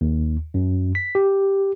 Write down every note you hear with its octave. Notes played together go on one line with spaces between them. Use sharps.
D#2
F#2
B6
G4